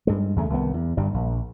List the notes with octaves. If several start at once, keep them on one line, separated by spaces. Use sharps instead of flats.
G2 G#3
E2 C#3 A3
C2 D#3 B3
E2
G1 G2 G3
A#1